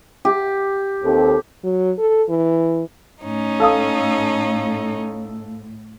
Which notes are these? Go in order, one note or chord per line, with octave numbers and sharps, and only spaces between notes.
G4
D#2 C4 A4
F#3
A4
E3
A2 C#4 D#4
A4 F5 D#6